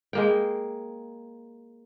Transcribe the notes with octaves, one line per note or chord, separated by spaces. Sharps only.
G#3 A#3 G5